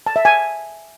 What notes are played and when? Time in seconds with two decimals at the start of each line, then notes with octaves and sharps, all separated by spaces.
0.06 A5
0.16 E5
0.25 G#5